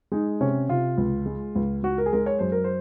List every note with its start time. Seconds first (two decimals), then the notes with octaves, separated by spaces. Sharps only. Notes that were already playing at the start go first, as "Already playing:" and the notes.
0.12 G#3 D#4
0.41 C3 C#4
0.69 C3 F4
0.98 C#2
1.26 G#3
1.55 C#2
1.83 C#2 F#4
1.98 A#4
2.06 G#4
2.13 G#3 A#4
2.26 C#5
2.39 F#2 C5
2.52 A#4
2.64 C5